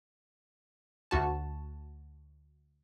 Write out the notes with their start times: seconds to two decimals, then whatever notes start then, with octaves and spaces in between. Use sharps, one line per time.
1.11 D2 F#4 A5